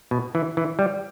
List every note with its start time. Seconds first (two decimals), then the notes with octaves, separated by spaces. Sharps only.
0.11 B2
0.35 E3
0.57 E3
0.79 G3